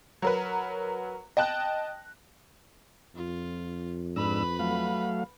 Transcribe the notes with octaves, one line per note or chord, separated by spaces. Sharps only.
F#3 A#4 B4
D#5 G5 A5 F#6
F2 F4
G#2 D4 B4 B5 E6
F#3 A3 F5